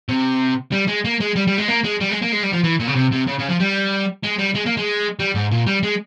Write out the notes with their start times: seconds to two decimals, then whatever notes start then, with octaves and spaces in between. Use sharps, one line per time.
0.09 C3
0.72 G3
0.88 G#3
1.05 A#3
1.20 G#3
1.36 G3
1.47 G3
1.58 G#3
1.68 A#3
1.84 G#3
2.00 G3
2.11 G#3
2.22 A#3
2.32 G#3
2.43 G3
2.53 F3
2.64 E3
2.80 A#2
2.88 C#3
2.95 C3
3.12 C3
3.27 C#3
3.39 C#3
3.49 F3
3.60 G3
4.24 G#3
4.39 G3
4.55 G#3
4.66 A#3
4.77 G#3
5.20 G3
5.35 G#2
5.51 A#2
5.67 G3
5.83 G#3